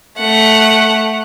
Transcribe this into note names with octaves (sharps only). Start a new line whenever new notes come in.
A3 F#5